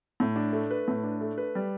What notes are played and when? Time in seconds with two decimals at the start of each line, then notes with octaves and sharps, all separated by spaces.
0.20 A2
0.36 D4
0.53 A3
0.71 B4
0.88 A2
1.04 D4
1.21 A3
1.38 B4
1.55 G3